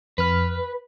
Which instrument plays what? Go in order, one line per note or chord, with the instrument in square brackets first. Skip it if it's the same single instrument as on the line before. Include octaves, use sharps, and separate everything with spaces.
[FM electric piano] F2 F6 [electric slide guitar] B4